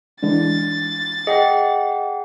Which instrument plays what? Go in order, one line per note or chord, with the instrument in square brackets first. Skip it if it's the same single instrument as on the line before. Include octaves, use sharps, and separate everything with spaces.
[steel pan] E3 G#3 D4 [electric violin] A6
[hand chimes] G#4 F#5 G5 [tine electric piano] D#5